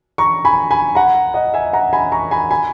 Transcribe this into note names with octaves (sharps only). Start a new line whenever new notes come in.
A#5 C#6
G#5 B5
G#5 B5
F#5 A#5
D#5 F#5
E5 G#5
F#5 A#5
G#5 B5
A#5 C#6
G#5 B5
G#5 B5